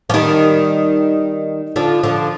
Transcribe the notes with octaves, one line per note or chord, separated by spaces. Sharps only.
F3
D#3 G3
D3 F3
D3 F3